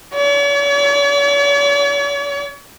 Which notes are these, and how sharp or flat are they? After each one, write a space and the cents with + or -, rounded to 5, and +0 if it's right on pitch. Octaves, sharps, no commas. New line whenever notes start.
C#5 +45